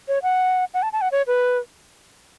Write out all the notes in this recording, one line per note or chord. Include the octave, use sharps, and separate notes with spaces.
C#5
F#5
F#5
A5
A5
F#5
C#5
B4